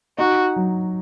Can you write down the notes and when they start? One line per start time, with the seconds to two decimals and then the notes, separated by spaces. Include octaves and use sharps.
0.18 D#4 F#4
0.56 F#3